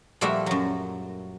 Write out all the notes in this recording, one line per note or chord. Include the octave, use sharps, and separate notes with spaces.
A#2 F3 G3 A3 F#4 E5
F#2 F#3